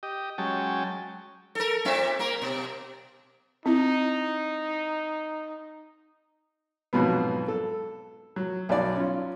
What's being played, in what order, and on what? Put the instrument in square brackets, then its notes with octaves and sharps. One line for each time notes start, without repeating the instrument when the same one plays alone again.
[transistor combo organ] G4 D#5
F#3 G#3 C#4 G5 A5
[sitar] A4 A#4
A#2 C4 E5
A#3 A#4
B2
[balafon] C4 E4 [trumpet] D#4
[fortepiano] F2 G#2 B2 F#3 B3
A4
F#3
B1 F#3 D5
C#4 F4